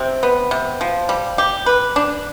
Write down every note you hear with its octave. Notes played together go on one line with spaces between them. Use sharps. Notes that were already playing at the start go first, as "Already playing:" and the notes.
Already playing: C3 C4
B3
C3
F3
G3
G4
B4
D4